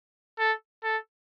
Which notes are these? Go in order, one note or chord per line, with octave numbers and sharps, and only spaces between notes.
A4
A4